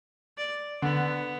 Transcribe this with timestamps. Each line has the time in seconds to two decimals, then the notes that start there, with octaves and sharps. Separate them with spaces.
0.38 D5
0.82 D3 B3